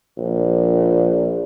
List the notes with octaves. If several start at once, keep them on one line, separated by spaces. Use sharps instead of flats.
A#1